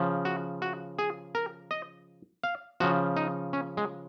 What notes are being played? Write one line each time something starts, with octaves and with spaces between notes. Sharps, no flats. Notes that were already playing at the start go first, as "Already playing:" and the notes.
Already playing: C#3 F3
F#4
F#4
G#4
A#4
D#5
F5
C#3 F3 F#4
D#4
C#4
G#3